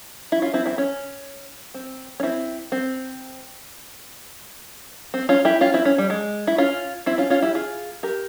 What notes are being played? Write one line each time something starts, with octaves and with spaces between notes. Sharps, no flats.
E4
C#4 F4
C4 E4
C4 E4
C#4
C4
C#4
C4 E4
C4
C4
C#4 F4
E4 G4
C#4 F4
C4 E4
C#4
G3
G#3
E4
C#4 F4
C4 E4
C#4 F4
C#4 F4
E4 G4
F4 G#4
G4 A#4